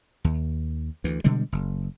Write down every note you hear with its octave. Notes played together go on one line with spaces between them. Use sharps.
D#2
D2 E3
B2 D3 G3 G#3
F#1